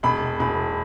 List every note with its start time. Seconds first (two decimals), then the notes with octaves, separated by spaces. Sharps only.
0.03 E1 B5
0.39 E1 B5